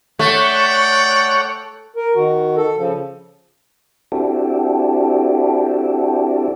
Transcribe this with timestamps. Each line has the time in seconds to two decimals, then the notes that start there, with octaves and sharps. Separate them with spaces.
0.19 A3 C#5 D5 F#5 G5
1.96 A#4
2.15 D#3 F#4
2.57 A4
2.77 C#3 F3
4.12 C4 D4 E4 F#4 G4 A4